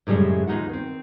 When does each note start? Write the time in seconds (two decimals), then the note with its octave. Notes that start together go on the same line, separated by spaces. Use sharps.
0.07 F#2 A2 C#3 G3 G#3
0.47 D#2 G#3 D#4 F4 F#5
0.69 D#3 C4